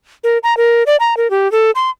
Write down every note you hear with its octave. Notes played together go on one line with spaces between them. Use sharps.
A#4
A#5
A#4
D5
A#5
A#4
G4
A4
C6